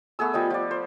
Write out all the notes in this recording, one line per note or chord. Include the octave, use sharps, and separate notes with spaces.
A3 B3 G#4 E6
F3 G3 D#5
F3 D5
C5